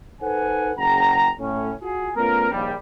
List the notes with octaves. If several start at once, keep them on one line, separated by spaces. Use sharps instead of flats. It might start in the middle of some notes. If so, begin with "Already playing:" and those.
D#4 A4 B4 C5 F#5 G#5
F#1 C#3 F#5 G5 A#5
A2 C#4
F4 F#4 G#4
A3 B3 C#4 F4 A#4
A#1 D#2 G3